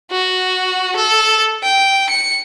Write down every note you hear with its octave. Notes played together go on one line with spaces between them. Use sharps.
F#4
A4
G5
C#7